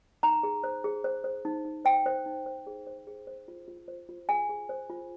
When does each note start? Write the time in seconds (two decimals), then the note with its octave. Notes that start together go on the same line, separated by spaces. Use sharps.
0.23 D#4 A#5
0.43 G#4
0.64 C5
0.84 G#4
1.04 C5
1.24 C5
1.45 D#4
1.65 D#4
1.85 C5 G5
2.06 C5
2.26 D#4
2.46 C5
2.67 G#4
2.87 C5
3.07 G#4
3.27 C5
3.48 F4
3.68 F4
3.88 C5
4.09 F4
4.29 G#4 G#5
4.49 G#4
4.69 C5
4.90 F4